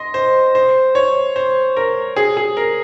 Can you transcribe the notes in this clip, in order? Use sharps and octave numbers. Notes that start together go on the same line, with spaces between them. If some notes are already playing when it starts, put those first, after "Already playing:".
Already playing: D#5 C6
C5
C5
C#5
C5
A#4
G#4
G#4
A#4